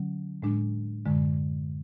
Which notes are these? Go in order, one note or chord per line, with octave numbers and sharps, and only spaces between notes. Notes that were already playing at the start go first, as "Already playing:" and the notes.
Already playing: D3 F#3 C#4
A2 G#3 D4
F#2 D3 G#3